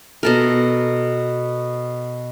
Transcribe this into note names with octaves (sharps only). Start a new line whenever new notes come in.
B2 A4 A#4